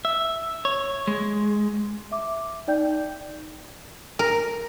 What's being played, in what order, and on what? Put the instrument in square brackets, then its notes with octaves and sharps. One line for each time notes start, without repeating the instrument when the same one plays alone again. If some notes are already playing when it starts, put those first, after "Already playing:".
[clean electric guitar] E5
C#5
G#3
[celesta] E5 D6
D#4 D5 G5 G6
[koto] A#4